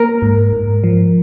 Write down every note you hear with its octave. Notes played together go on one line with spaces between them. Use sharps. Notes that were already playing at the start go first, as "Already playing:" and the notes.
Already playing: A#3 A#4
G#2
G#2
F3